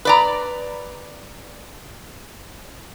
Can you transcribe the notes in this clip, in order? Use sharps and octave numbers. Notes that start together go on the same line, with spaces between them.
B4 D5 A#5